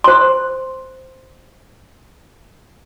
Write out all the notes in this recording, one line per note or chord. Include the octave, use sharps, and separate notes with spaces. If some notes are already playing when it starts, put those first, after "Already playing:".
C5 C6